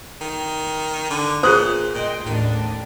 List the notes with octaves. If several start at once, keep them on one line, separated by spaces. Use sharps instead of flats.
D#3
D3
A#2 G#4 C5 D#6 F#6
A#2 D#5 G5 C6
A1 D#2 D#3 D4